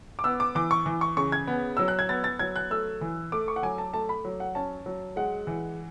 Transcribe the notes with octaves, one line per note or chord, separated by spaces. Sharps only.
D6
B3 E6
D6
E3 D6
C#6
E3
C#6
C#3 C#6
G#6
B3
F#3 E6
F#6
G#6
B3 A6
A6
F#3 G#6
F#6
A3 E6
E3
A3 D6
C#6
F#5
F#3 G#5
A5
A3 A5
B5
F#3
F#5
C#4 A5
F#3
G#3 F#5
E3